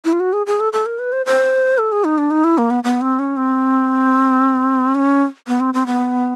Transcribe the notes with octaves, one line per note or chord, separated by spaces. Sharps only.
E4
F4
F#4
G#4
G#4
A4
A4
A#4
B4
C5
C5
A4
G#4
D#4
D4
D#4
E4
A#3
B3
B3
C4
C#4
C4
C#4
B3
C4
C4
B3